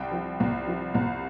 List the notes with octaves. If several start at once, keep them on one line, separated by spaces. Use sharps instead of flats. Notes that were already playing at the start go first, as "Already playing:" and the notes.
Already playing: C2 G5
F3
C2
F3
C2